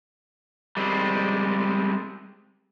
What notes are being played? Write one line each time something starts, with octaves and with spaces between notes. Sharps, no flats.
G3 G#3 C4